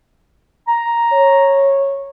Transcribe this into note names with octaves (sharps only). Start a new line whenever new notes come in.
A#5
C#5